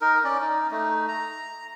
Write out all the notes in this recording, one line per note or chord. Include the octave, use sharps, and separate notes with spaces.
D#4 A#4
C#4 D5
D#4
A3 D#4
A#5